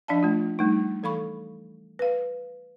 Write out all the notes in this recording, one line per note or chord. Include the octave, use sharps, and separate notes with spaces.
F3 D4 D5 F5 A5
A3 F4
G3 A3 D#4
E3 A4 F5 B5 C#6
B4 F5